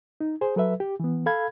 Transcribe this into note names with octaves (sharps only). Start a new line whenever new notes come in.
D#4
G#4 C5
F#3 A4 B4 E5
G4
E3 B3
A4 F5 B5 G#6